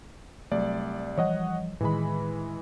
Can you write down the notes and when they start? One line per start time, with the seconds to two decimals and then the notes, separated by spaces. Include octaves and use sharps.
0.52 C2 F#3 A3 D5
1.17 E3 F3 G3 C#5 D#5 F#5
1.81 A2 D#3 E3 G#3 B5